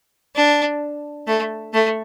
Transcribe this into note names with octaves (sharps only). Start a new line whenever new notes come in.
D4
A3
A3